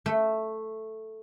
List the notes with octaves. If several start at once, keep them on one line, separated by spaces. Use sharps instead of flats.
A3